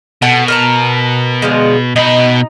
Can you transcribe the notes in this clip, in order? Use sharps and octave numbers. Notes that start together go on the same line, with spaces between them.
B2 A4 F#5 G#5
A#4 A5 A#5
D3 F3 G#3
B2 D#4 B5